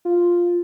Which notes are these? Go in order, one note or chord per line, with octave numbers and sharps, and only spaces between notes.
F4